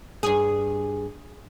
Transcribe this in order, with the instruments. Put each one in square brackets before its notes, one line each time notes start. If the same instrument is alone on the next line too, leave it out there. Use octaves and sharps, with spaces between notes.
[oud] G2 G#4